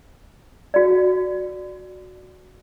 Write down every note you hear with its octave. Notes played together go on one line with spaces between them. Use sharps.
F#4 D5